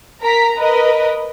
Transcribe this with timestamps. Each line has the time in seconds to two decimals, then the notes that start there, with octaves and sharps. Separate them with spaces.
0.22 A#4 A#5 B6
0.57 A#4 B4 D#5